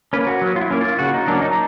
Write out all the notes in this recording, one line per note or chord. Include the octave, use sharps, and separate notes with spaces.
A#3 C#4 B4
F#4
F#3
F4
E4
A#3 C#4
F4
C#3 F#4
D#4
F#3 A#3 C#4 D4
D#4